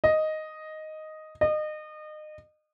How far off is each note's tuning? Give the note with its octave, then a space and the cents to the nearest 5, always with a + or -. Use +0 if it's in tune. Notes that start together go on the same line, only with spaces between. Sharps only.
D#5 +0
D#5 -30